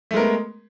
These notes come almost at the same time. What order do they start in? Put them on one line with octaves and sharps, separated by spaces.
A3 G#3 A#4 B3